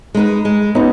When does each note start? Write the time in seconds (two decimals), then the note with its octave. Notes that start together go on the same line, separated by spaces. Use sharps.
0.14 G#3 D#4 B4
0.45 G#3
0.75 B3 C#4 D#4 F#4